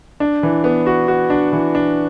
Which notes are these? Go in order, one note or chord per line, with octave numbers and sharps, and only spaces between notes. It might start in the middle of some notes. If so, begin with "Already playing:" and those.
D4
E3
B3
F#4
F#4
D4
E3
D4